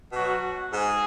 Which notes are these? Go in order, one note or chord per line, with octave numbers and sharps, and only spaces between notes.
B2 F#3 F#4
G#2 G#4